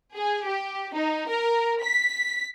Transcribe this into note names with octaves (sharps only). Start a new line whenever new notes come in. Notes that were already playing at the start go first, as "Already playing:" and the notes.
G#4
G4
D#4
A#4
B6